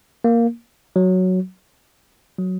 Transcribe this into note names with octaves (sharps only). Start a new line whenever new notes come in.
A#3
F#3
F#3